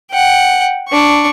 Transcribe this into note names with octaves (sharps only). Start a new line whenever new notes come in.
F#5 G5
D4 C#6